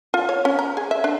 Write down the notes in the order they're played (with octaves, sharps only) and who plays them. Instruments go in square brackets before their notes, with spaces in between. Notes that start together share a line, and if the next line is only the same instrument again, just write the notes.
[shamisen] F4
C#5
C#4
A#5
G#4
E5
D4